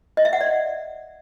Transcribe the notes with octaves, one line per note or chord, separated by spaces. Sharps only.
D#5
E5
F#5
D5